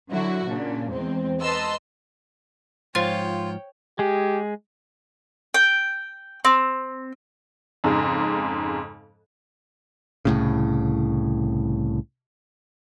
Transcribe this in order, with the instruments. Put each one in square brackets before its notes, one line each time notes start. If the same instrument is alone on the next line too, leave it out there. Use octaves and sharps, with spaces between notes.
[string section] D3 F#3 E4 F#4
A#2 C#3 D4
E2 G#3 C4
B4 D#5 A5 A#5 C6 E6
[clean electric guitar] G#2 F3 [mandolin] F4 [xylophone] C5 F5 A6 [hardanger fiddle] C#5 G5
[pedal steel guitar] G#3 G#4 [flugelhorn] G4
[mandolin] G5
C4
[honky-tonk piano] F2 G#2 C#3
[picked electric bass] C2 A2 C#3